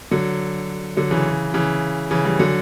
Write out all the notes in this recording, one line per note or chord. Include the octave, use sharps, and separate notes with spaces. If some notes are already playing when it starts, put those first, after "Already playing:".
D3 F#3
D3 F#3
C#3 E3
C#3 E3
C#3 E3
E3 G3
D3 F#3